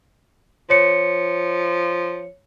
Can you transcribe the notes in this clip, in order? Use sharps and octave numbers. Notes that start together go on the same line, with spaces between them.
F3 C#5 C#7